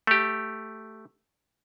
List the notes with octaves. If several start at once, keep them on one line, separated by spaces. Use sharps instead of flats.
A3 G4